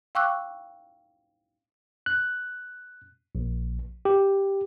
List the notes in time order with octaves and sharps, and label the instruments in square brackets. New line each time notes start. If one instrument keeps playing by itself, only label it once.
[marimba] F5 G5 C#6 D6 E6 F#6
[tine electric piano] F#6
A#1
G4